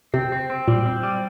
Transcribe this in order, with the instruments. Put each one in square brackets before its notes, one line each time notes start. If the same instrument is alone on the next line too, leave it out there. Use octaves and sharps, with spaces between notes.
[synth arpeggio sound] C3 [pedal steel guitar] C4
[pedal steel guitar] C4
C4
[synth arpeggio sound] A#2 [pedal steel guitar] G3
[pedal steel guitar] C4
G3